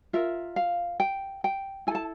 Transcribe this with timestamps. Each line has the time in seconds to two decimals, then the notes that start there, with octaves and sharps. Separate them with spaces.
0.13 F4 A#4 E5
0.56 F5
1.00 G5
1.44 G5
1.87 E4 G#5
1.91 A4 A5